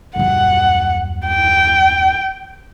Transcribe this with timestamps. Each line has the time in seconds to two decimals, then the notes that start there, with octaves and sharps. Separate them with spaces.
0.16 D#1 F#2 F#5
1.27 G5